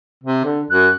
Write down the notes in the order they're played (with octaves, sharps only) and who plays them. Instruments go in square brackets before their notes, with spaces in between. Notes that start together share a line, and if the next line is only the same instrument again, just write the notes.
[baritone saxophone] C3
D3
[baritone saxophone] F#2 [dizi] F#6